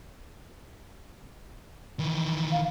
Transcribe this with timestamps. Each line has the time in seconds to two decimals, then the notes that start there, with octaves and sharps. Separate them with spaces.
1.99 D#3 E3
2.52 F5